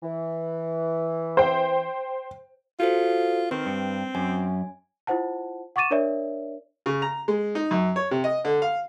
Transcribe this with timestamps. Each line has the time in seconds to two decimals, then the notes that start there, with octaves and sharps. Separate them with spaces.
0.03 E3
1.37 C5 G5
2.80 F4 F#4 A4 C5
3.51 D#3 C4 B4
3.66 G2
4.15 F#2 G#5
5.07 E4 F4 C5 F#5 A5
5.76 F#5 C#6 D6 A6 D#7 E7
5.91 D4 A#4 C#5 D5 E5
6.86 C#3
7.02 A#5
7.28 G#3
7.55 D#4
7.71 F#2
7.96 C#5
8.11 C3
8.24 D#5
8.45 D3
8.62 F5